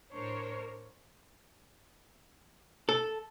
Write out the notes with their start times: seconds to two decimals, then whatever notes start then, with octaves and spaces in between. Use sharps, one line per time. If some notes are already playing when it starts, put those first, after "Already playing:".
0.11 A2 D4 A#4 C5 C#5
2.89 A4